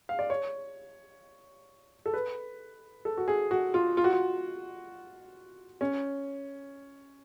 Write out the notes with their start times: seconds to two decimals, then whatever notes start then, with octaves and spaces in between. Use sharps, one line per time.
0.09 F5
0.19 D5
0.30 C#5
2.06 A4
2.14 B4
3.05 A4
3.18 F#4
3.28 G#4
3.51 F#4
3.74 F4
3.97 F4
4.04 F#4
4.12 F4
5.81 C#4